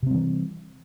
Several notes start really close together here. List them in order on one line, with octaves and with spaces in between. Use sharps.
C3 C4 G3 E3